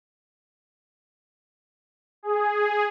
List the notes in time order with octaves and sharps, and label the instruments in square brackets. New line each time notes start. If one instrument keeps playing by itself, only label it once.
[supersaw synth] G#4